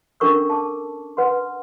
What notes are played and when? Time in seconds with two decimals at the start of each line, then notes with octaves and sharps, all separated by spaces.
0.20 C#4 D4 A4 A#4 C#6 E6
0.50 A5 D6
1.17 B4 F#5 C6